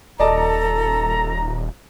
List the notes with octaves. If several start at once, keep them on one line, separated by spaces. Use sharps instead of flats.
D#1 A4 D5 D#5 A5 A#5